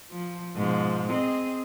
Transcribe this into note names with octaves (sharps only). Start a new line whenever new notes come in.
F3
G#2 B2 F3
C4 G#4 D#5